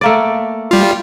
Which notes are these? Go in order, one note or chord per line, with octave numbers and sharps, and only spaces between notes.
A3 A#3 D5
G3 F4